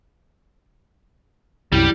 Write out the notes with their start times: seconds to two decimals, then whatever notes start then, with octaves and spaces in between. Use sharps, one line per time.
1.72 C2 F#2 G3 E4 G4